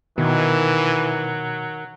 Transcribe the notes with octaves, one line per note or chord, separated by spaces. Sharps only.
B2 D#3 E3 F#3